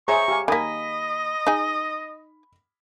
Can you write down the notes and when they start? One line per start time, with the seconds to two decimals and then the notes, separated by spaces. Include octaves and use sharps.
0.08 G#4 C5 C#5 E5 A#5 C#6
0.28 G4 F5 G#5
0.48 D#3 A#3 D#5 G#5 B5 B6
1.47 D#4 G#4